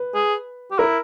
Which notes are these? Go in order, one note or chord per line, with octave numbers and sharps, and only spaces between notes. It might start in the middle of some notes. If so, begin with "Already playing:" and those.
Already playing: B4
G#4
G4
E4 A#4